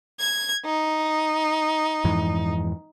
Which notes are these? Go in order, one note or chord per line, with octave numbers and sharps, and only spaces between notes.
G#6
D#4
F2 G#2 E3